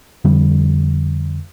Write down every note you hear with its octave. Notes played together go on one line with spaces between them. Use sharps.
F2 D3 G3